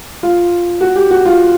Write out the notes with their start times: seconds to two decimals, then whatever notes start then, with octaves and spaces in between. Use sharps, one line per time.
0.23 F4
0.81 F#4
0.96 G4
1.11 F#4
1.25 F4